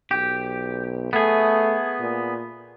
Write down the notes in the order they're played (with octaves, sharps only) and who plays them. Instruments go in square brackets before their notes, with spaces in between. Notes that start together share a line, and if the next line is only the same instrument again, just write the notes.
[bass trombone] B1 [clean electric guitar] G4
[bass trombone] A3 [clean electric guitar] B3 G#4
[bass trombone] A#2